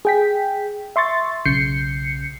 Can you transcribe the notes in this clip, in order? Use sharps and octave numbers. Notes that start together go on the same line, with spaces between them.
G#4 G5 B6
E5 C6 C#6 A6
B1 C#3 G6 C7 C#7